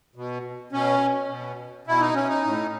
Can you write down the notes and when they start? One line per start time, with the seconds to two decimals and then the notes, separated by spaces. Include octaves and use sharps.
0.16 B2
0.72 B2 C#4
1.29 B2
1.87 B2 E4
2.01 D#4
2.14 C#4
2.28 D#4
2.44 A2